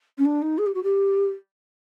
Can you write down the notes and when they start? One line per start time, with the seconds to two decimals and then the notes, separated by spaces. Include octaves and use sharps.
0.18 C#4
0.25 D4
0.41 D#4
0.58 G#4
0.66 G4
0.74 F#4
0.83 G4